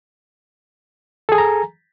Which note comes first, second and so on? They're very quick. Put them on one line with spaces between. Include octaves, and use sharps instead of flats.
A4 G#4 G#5 A#5